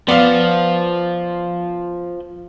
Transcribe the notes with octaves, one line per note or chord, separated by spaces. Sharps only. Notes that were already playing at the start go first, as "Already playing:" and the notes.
F3 B3 D5 F5